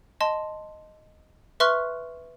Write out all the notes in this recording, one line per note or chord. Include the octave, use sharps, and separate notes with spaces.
D#5 A5 C6
B4 E5 C6 C#6 F6 F#6